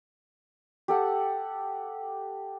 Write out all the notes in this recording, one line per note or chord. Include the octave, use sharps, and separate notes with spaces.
G4 A4 F#5